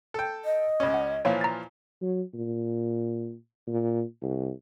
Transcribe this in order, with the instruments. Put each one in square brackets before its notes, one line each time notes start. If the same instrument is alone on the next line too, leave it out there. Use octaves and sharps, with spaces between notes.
[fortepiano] A4 G5
[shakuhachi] D#5
[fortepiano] C#2 C#4
[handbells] F#5
[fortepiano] A#2 E3 F3 [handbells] C#5 F5
[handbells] A#5 A6
[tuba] F#3
A#2
A#2
C2